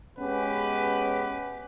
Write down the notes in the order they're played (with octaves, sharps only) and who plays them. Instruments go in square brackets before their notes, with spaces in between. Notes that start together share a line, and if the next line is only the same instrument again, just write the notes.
[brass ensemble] G#3 B3 C#4 G4 B4